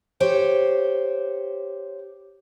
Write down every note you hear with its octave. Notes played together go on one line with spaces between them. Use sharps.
G4 C5 C#5